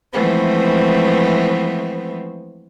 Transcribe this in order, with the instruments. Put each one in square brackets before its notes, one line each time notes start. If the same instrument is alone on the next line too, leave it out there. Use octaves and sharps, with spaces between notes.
[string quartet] E3 F3 G#3 A3 B3 C4